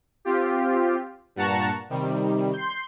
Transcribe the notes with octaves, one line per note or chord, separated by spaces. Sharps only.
C4 F4 G4
G2 A#2 F#5 A5 A#5 C#6
C3 D#3 G3
C6 G6